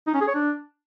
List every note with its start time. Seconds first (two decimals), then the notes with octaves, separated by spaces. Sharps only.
0.07 D#4
0.14 C#4
0.21 G#4
0.28 C#5
0.35 D4